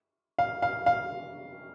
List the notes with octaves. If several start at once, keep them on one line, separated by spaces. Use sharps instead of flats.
F5
F5
F5